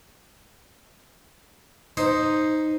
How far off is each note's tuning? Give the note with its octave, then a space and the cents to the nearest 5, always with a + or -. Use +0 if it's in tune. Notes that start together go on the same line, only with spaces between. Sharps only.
D#4 +0 C5 +0